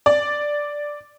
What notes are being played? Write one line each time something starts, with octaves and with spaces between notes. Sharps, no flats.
D5